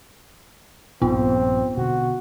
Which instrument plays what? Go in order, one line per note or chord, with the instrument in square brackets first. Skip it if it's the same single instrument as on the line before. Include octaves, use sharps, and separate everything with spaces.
[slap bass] A#1 G2 A#2 [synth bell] B3 F4 [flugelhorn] C4
[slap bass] B2 D3 [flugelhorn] F#4